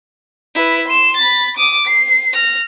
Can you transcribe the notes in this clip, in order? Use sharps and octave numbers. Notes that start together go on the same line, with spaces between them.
E4 B4
C6 E7
B5 A6
D6 D#6
C7
F6 A#6